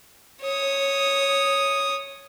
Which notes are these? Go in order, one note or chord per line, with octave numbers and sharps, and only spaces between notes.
C#5 D#6